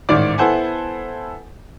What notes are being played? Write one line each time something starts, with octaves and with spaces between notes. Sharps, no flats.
A1 G#2 D#3 D5 D6
B3 E4 A4 C5 F#5 G#5